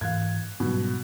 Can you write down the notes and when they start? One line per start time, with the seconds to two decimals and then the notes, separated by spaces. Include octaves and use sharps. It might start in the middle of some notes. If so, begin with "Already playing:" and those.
0.01 G#2 E3 F5 F#6 G#6
0.60 G#2 B2 F#3 G3